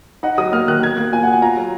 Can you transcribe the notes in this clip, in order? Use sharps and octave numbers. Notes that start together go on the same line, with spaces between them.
D#4 F#5
F#3 D#6
A#3 F6
D#3 F#6
B2 G#6
A#3 F#6
F4 G#5
F#5
B2
G#5
F4 A#5
F#3